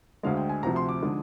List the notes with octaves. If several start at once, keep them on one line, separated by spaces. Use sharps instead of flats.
D2 D3 G#3 F5
G5
G#5
D2 C3 F3 A#5
C6
D6
D3 F3 G#3 D#4